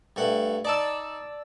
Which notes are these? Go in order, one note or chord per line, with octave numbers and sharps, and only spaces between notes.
G2 A3 F#5
D#4 D5 A5 E6